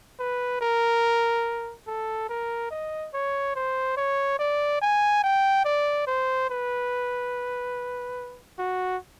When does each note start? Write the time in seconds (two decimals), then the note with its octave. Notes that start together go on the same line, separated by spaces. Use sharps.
0.20 B4
0.61 A#4
1.87 A4
2.29 A#4
2.71 D#5
3.14 C#5
3.56 C5
3.97 C#5
4.39 D5
4.82 G#5
5.24 G5
5.65 D5
6.07 C5
6.50 B4
8.59 F#4